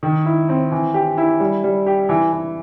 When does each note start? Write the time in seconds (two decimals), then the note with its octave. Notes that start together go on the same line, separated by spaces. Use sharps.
0.03 D#3
0.26 E4
0.49 C4
0.72 E3
0.94 G4
1.18 E4
1.40 G3
1.64 G3
1.86 G4
2.09 E3
2.32 E3